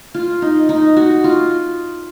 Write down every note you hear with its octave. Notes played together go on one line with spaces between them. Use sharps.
F4
D#4
D#4
F#4
F4